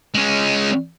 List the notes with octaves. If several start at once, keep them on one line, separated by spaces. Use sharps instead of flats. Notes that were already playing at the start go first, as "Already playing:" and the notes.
G#3 C#4